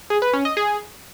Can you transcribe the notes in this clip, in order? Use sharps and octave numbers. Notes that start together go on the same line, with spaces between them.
G#4
B4
C#4
D#5
G#4